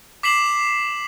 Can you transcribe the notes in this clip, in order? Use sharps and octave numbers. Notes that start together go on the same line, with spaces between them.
D6 B6 C7 E7 F#7